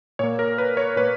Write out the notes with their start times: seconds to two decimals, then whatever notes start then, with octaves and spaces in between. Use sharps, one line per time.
0.19 A#2 A#3 C#5
0.39 A#4
0.58 B4
0.77 C#5
0.96 A#2 A#3 B4